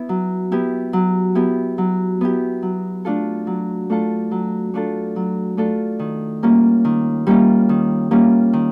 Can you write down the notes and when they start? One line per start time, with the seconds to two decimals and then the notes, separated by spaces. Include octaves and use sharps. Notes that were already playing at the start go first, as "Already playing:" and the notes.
Already playing: B3 E4
0.09 F#3
0.52 B3 E4 G4
0.93 F#3
1.35 B3 E4 G4
1.78 F#3
2.21 B3 E4 G4
2.63 F#3
3.05 A3 D4 F4 A4
3.47 F#3
3.90 A3 D4 F4 A4
4.31 F#3
4.74 A3 D4 F4 A4
5.16 F#3
5.57 A3 D4 F4 A4
5.99 D#3
6.43 G3 A#3 C#4 F4
6.85 D#3
7.27 G3 A#3 C#4 F4
7.69 D#3
8.11 G3 A#3 C#4 F4
8.53 D#3